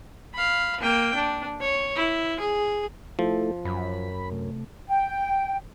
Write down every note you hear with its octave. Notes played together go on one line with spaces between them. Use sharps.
F5 B5
A#3 G5
D4
C#5
E4
G#4
F3 A3 E4 A4
F#2 B5
C3 A3
G5